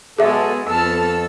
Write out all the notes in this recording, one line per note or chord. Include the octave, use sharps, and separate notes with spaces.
B2 F#3 G#3 B3 G#4 A4 E5
F2 B3 A4 A5 E6 F6